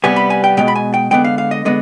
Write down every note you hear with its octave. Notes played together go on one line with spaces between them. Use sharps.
C3 G3 B3 G#5
B5
G#5
G5
B2 G#3 B3 G5
B5
G#5
G5
D3 G#3 B3 G5
F5
F5
D#5
D3 G#3 B3 D#5